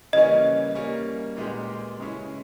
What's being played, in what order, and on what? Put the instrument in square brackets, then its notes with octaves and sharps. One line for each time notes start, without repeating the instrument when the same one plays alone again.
[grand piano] C#3 E3 G3 A#3 C#4 [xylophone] D#5
[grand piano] G3 A#3 C#4
A#2 G#3 B3 G4
C#3 G#3 C#4 E4